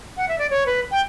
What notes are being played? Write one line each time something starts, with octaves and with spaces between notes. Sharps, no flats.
F#5
E5
D5
C#5
B4
G5